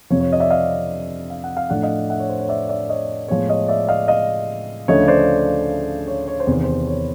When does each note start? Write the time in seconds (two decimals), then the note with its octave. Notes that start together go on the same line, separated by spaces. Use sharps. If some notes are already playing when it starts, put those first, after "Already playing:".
0.10 F2 C3 F3 C#5
0.21 C#5
0.32 D#5
0.40 D5 E5
0.50 D#5 F5
1.30 F5
1.44 F#5
1.57 F5
1.70 A2 F3 A3 D4 F#5
1.83 D#5 F5
2.10 E5 F#5
2.19 C#5
2.29 C5
2.40 C#5
2.49 D5 E5
2.69 D5 E5
2.89 C#5 D#5
3.28 A2 F3 G#3 B3 C#5
3.49 C#5 D#5
3.68 D5 E5
3.89 D#5 F5
4.08 D#5 F5
4.88 D2 C#3 F3 A3 D4 C#5 D#5
5.08 C5 D5
6.07 C#5
6.28 C#5
6.40 C5
6.47 E2 C3 D#3
6.64 C5
6.87 C#5